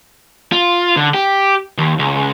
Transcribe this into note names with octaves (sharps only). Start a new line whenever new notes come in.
F4
D3
G4
D#2
C#2